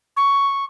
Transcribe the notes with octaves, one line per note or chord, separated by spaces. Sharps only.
C#6